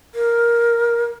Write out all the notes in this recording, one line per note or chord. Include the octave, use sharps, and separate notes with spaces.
A#4